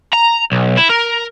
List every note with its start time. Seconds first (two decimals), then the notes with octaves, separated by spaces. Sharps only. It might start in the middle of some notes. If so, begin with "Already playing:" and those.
0.13 A#5
0.52 B1
0.77 E4
0.90 A#4